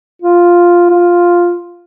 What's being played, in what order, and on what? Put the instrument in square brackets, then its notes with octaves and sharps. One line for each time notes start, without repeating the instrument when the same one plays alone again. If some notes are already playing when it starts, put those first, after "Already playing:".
[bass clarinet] F4
F4